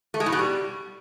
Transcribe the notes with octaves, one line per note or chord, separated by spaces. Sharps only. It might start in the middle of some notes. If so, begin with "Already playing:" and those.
A3
G#3
A2
B2
G3